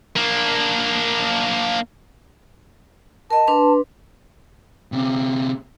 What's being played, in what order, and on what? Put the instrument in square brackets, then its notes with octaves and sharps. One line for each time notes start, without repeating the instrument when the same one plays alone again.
[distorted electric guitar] A#3 D4
[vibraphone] A#4 D#5 [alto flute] A5
[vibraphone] D4 B4 C6
[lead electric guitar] C3 C#4